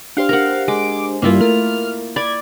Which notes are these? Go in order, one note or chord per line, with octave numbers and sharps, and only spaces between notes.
D4 G4 C5 F5
A#4 F#5
G#3 D6
G2 A#3 E4 F4
A3 A#4 F6
D5 B5 G#6